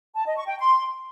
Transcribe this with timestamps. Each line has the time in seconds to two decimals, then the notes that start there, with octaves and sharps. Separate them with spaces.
0.15 A5
0.26 D#5
0.37 C#6
0.48 G5
0.59 C6